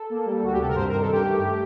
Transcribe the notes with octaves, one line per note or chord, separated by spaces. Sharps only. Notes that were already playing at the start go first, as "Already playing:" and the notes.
Already playing: A4
A#3
G3
D2 F#4
G4
C3 A4
A#4
G2 C5
D#3 A#4
A4
G2 G4
A3